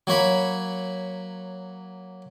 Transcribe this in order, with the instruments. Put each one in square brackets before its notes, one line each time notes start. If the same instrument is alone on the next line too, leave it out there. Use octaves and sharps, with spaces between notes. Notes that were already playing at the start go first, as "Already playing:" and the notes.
[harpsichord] F#3 A#3 C#5 B5